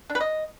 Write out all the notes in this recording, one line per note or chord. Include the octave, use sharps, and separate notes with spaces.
D4
B4
D#5